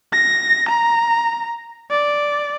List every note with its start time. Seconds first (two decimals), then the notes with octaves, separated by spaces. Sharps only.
0.13 A#6
0.69 A#5
1.90 D5